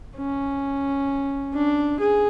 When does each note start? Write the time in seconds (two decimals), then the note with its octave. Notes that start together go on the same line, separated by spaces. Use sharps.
0.17 C#4
1.53 D4
2.00 G#4